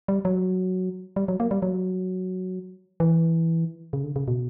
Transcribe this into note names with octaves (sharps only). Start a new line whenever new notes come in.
G3
F#3
G3
F#3
A#3
G3
F#3
E3
C#3
D3
C#3
B2